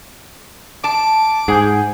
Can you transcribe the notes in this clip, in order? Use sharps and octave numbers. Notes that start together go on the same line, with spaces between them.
A5 D6
G#2 G#4 F#5 G#5 G6